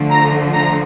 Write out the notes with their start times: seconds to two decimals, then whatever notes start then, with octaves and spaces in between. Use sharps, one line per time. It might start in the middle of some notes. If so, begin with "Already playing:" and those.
Already playing: D3 F3 A3
0.11 A#5
0.54 A#5